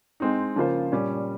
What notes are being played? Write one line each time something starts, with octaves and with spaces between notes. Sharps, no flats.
G#3 C4 D#4
C#3 F3 A#3 F4 C5
A#2 G3 C#4